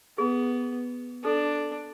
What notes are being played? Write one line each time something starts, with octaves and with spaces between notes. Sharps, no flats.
B3 G#4
D4 A4